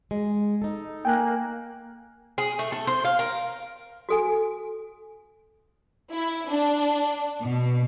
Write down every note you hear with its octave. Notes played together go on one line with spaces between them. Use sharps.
G#3
D#4 A4
A#3 G5 G#5 F#6
G#4
A3
A4
C5
F5
A#4
F#4 A4 G#5
E4
D4
B2